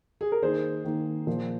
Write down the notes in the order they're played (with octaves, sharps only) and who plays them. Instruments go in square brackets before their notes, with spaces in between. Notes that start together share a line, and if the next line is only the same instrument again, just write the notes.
[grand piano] G#4
A#4
[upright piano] D#3 A#3 D#4 [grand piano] G#4 C5
[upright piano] D#3 A#3 D#4
A#2 F3 A#3 F4